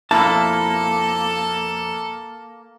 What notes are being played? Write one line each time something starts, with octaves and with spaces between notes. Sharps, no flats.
F2 B2 A#3 E4 A4 A5